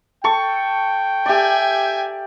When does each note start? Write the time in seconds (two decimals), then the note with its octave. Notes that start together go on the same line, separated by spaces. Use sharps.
0.24 A4 G5 C#6
1.26 G4 D5 E5 G#5